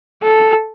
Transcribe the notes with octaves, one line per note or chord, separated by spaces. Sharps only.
A4